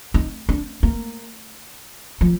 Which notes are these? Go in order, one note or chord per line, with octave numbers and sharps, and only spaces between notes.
D#4
D4
A#3
F3